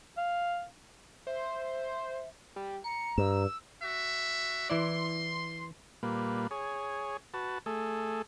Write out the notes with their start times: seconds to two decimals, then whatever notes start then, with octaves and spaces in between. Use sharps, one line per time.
0.17 F5
1.27 C5 E5
2.56 G3
2.84 A#5 C#7
3.18 G2 E6
3.83 F#4 E5
4.70 E3 E4 D5 C6
6.03 A#2 G3 A#3 B4
6.51 G#4 C#5
7.34 F#4 B4 A5
7.66 A3 G#4 A4